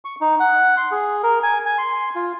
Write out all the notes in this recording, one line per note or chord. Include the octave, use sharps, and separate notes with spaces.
C#6
D#4
F#5
C6
G#4
A#4
G#5
G#5
C6
F4